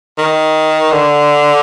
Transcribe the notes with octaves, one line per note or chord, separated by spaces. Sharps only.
D#3
D3